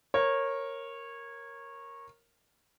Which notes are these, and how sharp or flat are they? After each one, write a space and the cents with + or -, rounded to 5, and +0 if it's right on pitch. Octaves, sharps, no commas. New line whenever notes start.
A#4 +0 C#5 -20